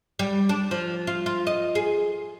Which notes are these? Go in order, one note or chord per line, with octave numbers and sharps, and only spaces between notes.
G3
D4
F3
F4
F4
D#5
G#4